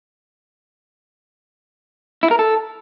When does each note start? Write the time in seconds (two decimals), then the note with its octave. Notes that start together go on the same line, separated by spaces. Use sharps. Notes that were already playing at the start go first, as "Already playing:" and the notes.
2.23 E4
2.31 A#4
2.39 A4